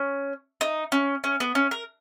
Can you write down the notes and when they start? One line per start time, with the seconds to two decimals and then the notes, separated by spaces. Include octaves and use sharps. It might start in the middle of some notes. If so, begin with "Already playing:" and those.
Already playing: C#4
0.61 D#4
0.92 C#4
1.24 C#4
1.40 B3
1.55 C#4
1.71 A#4